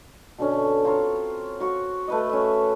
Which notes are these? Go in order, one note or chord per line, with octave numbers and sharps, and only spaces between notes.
B2 D3 C#4
C4 F4 C#5 A#5
F#4 C#6
A3 B4 D#5
C#4 E5